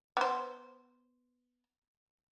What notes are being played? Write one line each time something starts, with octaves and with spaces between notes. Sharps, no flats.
B3 C5